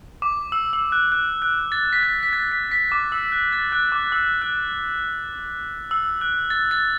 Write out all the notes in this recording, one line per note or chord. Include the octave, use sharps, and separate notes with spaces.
D6
E6
E6
F#6
F#6
F#6
A6
B6
A6
B6
A6
B6
B6
D6
E6
F#6
A6
F#6
D6
E6
F#6
E6
F#6
A6
A6